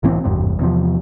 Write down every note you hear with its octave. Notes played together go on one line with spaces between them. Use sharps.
C2 A2 E3 C4
G#1 E2 G2 C3
E2 C3 F3